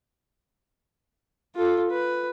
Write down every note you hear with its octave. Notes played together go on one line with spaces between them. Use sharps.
F4 A4
B4